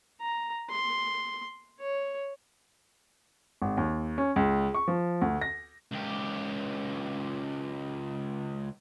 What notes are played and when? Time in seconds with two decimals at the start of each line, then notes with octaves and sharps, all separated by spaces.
0.22 A#5
0.71 C6
1.80 C#5
3.62 G#1
3.77 D#2
4.18 C#4
4.36 C#2
4.74 C#6
4.88 F3
5.22 D2
5.42 A#6
5.91 C#2 G4